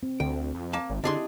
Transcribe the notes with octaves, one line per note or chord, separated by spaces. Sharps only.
C4
D2 G5
F2
A#3 A5
G#1
D3 D4 E4 G4 G#4 D#5 C6